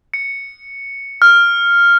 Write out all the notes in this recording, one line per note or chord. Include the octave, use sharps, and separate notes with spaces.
C#7
F6